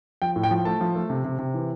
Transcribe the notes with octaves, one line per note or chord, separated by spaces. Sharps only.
F3 G5
A2
G5
F3
A3 A5
F3
A3
C3
C3
C3
E3